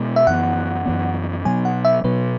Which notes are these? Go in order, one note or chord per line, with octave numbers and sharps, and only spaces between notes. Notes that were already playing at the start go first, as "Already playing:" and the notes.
Already playing: B2 G#3 B3
E5
F#2 E3 B3 F#5
F#2 E3 B3
B2 F#3 B3 G#5
F#5
E5
B2 F#3 B3 B4